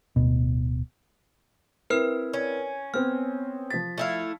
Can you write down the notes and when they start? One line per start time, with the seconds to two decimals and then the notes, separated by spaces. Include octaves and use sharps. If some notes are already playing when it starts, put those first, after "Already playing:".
0.16 D1 B2
1.90 C4 E4 A#4 B4 F6
2.33 C#4
2.94 B3 C4 F6
3.70 F3 A6 B6
3.98 A3 E4 F5